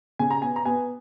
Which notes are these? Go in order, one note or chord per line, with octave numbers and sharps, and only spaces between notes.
C#3 G#5
A#5
B3 G#5
A#5
B3 G#5